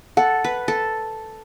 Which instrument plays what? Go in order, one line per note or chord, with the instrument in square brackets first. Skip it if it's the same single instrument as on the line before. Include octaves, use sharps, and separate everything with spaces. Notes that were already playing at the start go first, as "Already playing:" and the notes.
[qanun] A4 [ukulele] F#5
[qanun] B4
A4